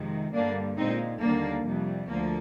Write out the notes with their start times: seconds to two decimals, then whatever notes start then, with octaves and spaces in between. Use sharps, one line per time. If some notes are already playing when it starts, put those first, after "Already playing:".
Already playing: F2 C3 D#3 G#3
0.33 G2 D3 G3 A#3 D4
0.77 A#2 G#3 C4 D#4
1.21 D#2 D3 G3 A#3 D4
1.65 F2 C3 G3
2.09 D2 D3 F3 A#3